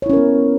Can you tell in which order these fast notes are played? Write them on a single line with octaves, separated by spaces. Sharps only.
C#5 E4 C#4 A#4 B3